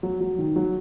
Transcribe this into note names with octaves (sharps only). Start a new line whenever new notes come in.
F#3
F#3
D#3
F#3